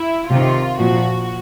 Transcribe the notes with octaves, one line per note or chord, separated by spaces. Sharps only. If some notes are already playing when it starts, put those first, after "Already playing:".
Already playing: E4
C3 D#3 F4
A#2 F3 F#4